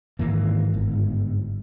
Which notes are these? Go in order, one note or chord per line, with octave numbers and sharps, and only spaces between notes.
G#2 D#3 E3 A#3
G1 G#2